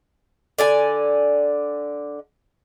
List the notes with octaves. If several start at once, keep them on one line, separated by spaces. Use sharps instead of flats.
D3 D5 G#5